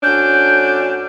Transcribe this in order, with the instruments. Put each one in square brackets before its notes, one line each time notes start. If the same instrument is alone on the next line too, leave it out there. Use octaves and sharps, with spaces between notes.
[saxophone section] D2 C#4 D4 [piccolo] G6